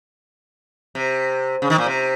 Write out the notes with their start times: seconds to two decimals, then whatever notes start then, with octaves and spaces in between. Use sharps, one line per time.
0.95 C3
1.62 C#3
1.70 D#3
1.78 A#2
1.86 C3